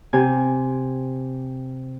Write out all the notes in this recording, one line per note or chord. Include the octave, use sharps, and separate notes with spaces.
C3 G#5